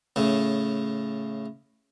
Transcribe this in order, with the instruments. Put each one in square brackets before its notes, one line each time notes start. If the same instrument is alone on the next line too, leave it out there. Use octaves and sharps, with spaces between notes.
[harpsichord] A2 C#3